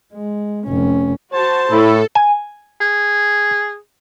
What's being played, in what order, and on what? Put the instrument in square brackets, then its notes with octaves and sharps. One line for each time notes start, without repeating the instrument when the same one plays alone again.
[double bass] G#3
F1 C#4
[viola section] F#4 A5 [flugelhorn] C5
[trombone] A2 [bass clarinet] E4 [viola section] A4
[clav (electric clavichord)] G#5
[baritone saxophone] G#4